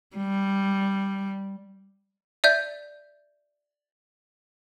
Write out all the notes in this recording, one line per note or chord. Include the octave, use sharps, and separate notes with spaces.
G3
D5 E5 G6